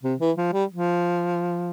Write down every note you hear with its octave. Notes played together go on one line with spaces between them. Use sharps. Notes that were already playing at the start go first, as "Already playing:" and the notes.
C3
E3
F3
G3
F3